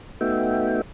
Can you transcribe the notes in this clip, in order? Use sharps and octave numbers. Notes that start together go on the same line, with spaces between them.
A3 B3 D#4 F#4 E5 G5